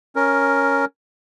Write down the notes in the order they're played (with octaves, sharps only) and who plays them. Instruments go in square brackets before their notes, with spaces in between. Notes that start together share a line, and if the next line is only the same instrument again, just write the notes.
[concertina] C#4 A#4